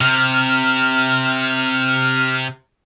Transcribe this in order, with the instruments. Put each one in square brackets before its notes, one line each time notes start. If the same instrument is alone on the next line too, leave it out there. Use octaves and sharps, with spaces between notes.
[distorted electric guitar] C3 [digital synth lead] F6